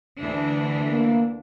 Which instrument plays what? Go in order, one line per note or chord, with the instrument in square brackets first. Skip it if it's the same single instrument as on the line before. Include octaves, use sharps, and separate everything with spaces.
[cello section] D2 E3 D4
[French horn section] A#3